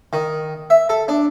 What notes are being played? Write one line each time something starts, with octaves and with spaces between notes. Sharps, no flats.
D#3
E5
A4
D4